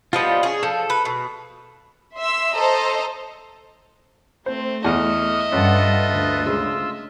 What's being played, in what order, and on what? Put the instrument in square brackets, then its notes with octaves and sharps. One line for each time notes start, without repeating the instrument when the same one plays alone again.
[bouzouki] F3 G3 B3 [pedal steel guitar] F4 D#5
[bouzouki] C#4 G#4
[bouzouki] F3 [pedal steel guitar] A4
[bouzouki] B4
B2
[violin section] E5 C6 E6
A4 C5 D#5 A#5
[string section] A3 [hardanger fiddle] C4 [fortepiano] C5
[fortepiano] E2 [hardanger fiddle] D#5 E5 [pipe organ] C#6 D#6 F6
[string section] G2 F#5 [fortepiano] C#4 [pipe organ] F4 A4 B4
[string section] D2
[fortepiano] C#3 G#3 [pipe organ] F4 E6